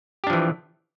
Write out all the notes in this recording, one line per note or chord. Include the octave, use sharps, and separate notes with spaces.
E3 F3 D4 G4